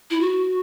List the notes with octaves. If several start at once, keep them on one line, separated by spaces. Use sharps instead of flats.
E4
F#4